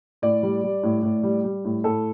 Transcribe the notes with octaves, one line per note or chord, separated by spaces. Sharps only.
A2 D5
G3
G3
A2
A2
G3
G3
A2
A2 A4